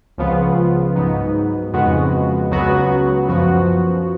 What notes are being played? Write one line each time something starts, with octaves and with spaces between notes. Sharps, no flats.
C#2 C#3 F3 B3 F4
G#2 F#3 B3 D#4
F2 C#3 G#3 B3 F#4
C#2 C#3 F#3 B3 F#4
F#2 F3 B3 F#4